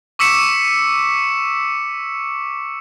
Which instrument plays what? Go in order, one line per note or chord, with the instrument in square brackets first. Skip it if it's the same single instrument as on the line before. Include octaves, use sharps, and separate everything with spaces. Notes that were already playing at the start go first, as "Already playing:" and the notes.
[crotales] C#6 D6 E6 B6 C#7 E7